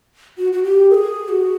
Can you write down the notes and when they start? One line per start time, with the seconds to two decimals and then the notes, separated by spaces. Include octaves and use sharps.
0.38 F#4
0.53 F#4
0.63 G4
0.90 A#4
0.94 G#4
1.29 F#4